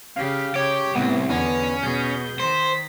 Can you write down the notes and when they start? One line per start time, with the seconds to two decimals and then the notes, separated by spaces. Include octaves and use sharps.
0.16 C#3 G4 F5
0.55 C#3 G4 C#5 G5
0.95 C2 A2 B3
1.30 E2 D3 B3 C#4
1.82 B2 G#4 G6
2.40 D#3 C5 B6